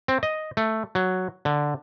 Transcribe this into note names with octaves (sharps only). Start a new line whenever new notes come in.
C4
D#5
A3
F#3
D3